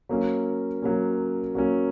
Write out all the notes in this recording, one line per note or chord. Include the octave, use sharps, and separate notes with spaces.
F#3 A#3 C#4
F#3 A#3 C#4
F#3 A#3 C#4